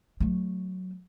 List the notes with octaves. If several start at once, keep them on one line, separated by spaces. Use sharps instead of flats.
F#3 A3